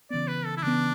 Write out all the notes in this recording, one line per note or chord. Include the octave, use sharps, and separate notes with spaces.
C#3 E3 B3 D5
B4
A4
E4
C#3 E3 B3 D4